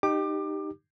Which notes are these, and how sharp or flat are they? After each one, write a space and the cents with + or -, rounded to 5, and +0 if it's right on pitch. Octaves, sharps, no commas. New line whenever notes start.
D#4 -20 G4 +0 D6 +25